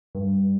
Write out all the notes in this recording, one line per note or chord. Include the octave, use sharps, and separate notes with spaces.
G2